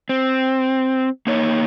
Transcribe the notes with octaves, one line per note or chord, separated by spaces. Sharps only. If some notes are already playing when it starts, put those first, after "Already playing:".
C4
A#3 D#4 C#5